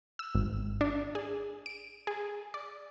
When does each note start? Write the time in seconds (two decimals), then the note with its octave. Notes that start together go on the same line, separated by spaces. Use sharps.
0.19 E6
0.35 G#1
0.81 D4
1.15 G#4
1.66 D7
2.07 G#4
2.54 D5